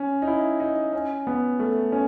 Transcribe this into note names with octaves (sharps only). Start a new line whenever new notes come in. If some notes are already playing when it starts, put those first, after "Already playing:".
Already playing: C#4
D#4
E4
D#4
C#4
B3
A3
C#4